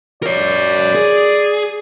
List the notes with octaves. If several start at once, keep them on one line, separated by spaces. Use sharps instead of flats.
A#4 C#5 D5
G#4